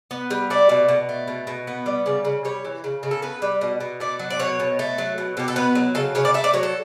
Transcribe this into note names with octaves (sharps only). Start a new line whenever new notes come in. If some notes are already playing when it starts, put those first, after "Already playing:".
B3
G3
A3 D5
B2
B2
A3
B2
B2
B3
G3
C#3 D5
C#3
G3 C#5
E3
C#3
C#3
A4
B3 B4
G3
B2
B2
A3 D5
F#3
D5
B2 C#5
B2
A3
F#3
B2
B2 G4
A4
B3 B4
F#3
C#3 A4
C#3 C#5
D5
A3 E5
D5
F#3 C#5
A4